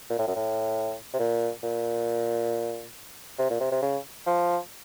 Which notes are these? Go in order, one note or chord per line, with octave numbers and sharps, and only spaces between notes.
A#2
A2
F#2
A2
C3
A#2
A#2
C3
A#2
C3
C3
C#3
F3